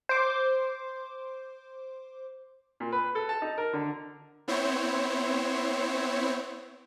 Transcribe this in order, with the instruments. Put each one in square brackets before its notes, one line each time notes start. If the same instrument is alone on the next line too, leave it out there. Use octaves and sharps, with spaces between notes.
[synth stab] C5 D6
[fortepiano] A#2
B4
A4
A5
D#4
A#4
D3
[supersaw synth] B3 C4 E4 C5 C#5